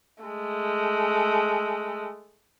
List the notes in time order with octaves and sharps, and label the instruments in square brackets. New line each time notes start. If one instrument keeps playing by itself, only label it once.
[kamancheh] G#3 A3